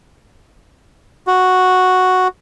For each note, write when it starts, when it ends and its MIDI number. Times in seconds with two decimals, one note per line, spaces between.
1.27 2.28 66